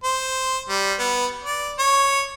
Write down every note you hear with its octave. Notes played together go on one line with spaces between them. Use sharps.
C5
G3
B3
D5
C#5